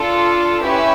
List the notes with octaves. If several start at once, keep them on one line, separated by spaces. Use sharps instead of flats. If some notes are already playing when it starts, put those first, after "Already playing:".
Already playing: D4 F4 A4
C#4 E4 G4 B4 E5